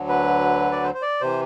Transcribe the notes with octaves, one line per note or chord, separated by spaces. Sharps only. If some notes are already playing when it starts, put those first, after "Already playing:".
Already playing: D2 D3 F#3
B4
D5
C5
C5
D5
C3 E3 C5